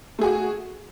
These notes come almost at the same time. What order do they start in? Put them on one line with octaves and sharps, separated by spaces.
A3 G#4 F#4